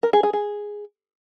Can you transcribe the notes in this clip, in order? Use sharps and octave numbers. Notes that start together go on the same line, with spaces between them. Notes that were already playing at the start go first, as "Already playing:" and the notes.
A#4
G#4
G#4
G#4